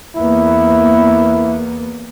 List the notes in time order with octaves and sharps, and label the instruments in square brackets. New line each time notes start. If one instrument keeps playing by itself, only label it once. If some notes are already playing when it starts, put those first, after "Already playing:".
[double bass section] E2 A#3 B3 [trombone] E4